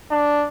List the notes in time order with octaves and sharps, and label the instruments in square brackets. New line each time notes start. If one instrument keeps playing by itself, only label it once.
[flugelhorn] D4